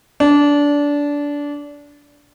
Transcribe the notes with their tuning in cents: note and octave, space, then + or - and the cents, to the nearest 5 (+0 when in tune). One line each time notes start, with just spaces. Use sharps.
D4 -20